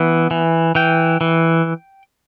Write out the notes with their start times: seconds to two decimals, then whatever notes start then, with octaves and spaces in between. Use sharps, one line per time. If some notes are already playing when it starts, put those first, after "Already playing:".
Already playing: E3 B3
0.31 E3
0.75 E3 G5
1.21 E3